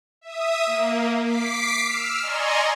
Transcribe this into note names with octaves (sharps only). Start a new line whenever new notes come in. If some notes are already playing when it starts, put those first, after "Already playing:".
E5 D#6
A#3
D6 B6 C7 D7
E6 F6
D5 D#5 G#5 A#5 C6 C#6